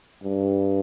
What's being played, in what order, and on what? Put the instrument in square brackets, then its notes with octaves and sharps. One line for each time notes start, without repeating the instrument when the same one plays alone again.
[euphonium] G2